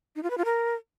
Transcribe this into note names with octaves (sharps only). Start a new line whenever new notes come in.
D#4
F4
B4
F4
A#4